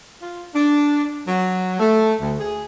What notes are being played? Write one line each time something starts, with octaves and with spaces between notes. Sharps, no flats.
F4
D4
F#3
A3
D2
G#4